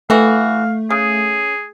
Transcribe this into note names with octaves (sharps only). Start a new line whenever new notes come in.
E3 A3 F#4 F5
C#3 G#4